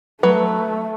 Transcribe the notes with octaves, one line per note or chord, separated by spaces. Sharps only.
F#3 A3 B4